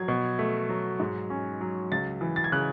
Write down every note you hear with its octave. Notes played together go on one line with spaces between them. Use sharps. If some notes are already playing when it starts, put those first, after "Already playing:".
Already playing: F#3 G#6
B2
A3
F#3
G#2
C#4
F#3
C#2 A6
E3
A6
G#6
C#3 F#6